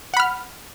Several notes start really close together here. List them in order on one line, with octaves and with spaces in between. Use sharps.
F#5 B5 F6